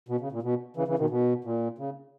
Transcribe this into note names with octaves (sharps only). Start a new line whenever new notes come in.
B2
C#3
A#2
B2
C#3 E3
C#3 E3
B2 D#3
B2
A#2
C#3